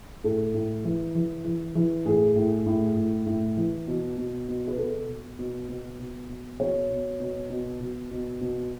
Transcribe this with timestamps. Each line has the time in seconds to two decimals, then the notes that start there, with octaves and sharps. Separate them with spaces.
0.24 A2 A4
0.54 A2
0.84 E3
1.15 E3
1.45 E3
1.75 E3
2.05 A2 G#4
2.36 A2
2.66 A2
2.97 A2
3.26 A2
3.57 E3
3.88 B2
4.17 B2
4.48 B2
4.68 B4
4.78 B2 A4
5.09 B2
5.39 B2
5.68 B2
6.00 B2
6.29 B2
6.60 B2 C#5
6.90 B2
7.20 B2
7.50 B2
7.80 B2
8.11 B2
8.41 B2